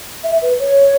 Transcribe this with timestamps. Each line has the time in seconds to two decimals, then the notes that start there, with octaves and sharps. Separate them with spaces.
0.24 E5
0.42 B4
0.60 C#5